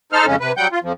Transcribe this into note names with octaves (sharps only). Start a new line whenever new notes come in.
D#4 A4 C5 F6
F2 C#3 G#3 C#4
C3 B4
F#3 G3 F#5 G5 G6
F4
F2 F3